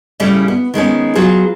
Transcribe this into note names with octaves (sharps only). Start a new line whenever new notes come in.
A2 C#3 G3 C#4 E4
B3
D#3 G#3 B3 C#4
F#3 F4 G#4 B4